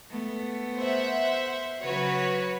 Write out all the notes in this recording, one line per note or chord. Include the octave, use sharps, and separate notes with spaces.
A3 B3
C5 E5 F#5
C#3 F#3 F#4 B4 C#5